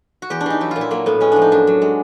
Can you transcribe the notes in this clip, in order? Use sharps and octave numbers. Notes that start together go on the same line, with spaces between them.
F#4
E2 G4
D4
E3 D#4
F#3 E4
A#2 F4
E4
F#3 A#3
A2 B3
G#3 C#4
F3 D4
D#4
F#2 D4
F#3
G#3